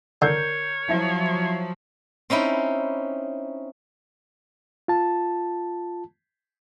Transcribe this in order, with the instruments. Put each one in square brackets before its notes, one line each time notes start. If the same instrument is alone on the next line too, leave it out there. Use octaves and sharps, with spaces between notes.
[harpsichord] D3 [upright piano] A#4 G6 C7 [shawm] C#5
[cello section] F3 F#3 [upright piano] E4 E5
[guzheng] C4 C#4 D#4 E4
[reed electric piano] F4 A5